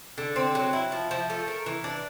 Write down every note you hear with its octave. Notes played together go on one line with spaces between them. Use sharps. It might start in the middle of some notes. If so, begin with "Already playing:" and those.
D3
C4
F#3
E4
F3
F3
A3
A#4
E3
D4